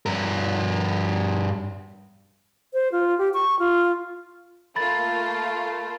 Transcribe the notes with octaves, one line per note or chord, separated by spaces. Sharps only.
G2 A#4
C5
F4
G4
C#6
F4
A3 A#3 F4 B5 A6